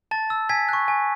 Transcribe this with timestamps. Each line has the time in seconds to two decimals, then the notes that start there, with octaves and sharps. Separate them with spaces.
0.11 A5 A6
0.30 E6
0.49 G#5 G#6 B6
0.69 C#6 F#6
0.88 G#5